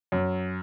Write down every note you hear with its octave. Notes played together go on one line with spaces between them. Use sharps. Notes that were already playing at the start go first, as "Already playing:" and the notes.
F#2